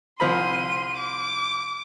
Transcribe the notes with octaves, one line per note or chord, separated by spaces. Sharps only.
C2 F3 B5 C6 D#7
D6